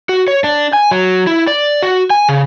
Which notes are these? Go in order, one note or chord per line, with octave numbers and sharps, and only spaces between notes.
F#4
C#5
D4
G#5
F#3
E4
D5
F#4
G#5
C#3